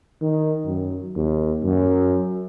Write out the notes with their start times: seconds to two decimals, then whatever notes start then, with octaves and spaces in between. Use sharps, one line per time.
0.22 D#3
0.67 F#2
1.16 D#2
1.65 F#2